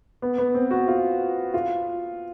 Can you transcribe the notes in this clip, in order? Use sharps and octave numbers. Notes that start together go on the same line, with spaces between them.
B3
B3
C4
F#4
F4
F4